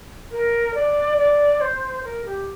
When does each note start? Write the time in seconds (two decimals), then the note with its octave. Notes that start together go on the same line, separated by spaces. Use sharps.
0.31 A#4
0.75 D5
1.18 D5
1.61 C5
2.04 A#4
2.25 G4